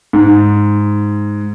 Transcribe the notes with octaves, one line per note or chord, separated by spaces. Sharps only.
G#2